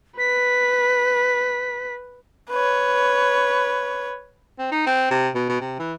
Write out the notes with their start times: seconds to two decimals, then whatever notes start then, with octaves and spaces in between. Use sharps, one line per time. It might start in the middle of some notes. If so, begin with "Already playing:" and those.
0.19 B4 B6
2.50 B4 C#5
4.58 C4
4.72 D#4
4.86 C4
5.11 C3
5.35 B2
5.49 B2
5.61 C3
5.79 E3